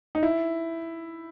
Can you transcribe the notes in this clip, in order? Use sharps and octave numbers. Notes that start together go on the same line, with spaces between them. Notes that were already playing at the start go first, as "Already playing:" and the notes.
D#4
E4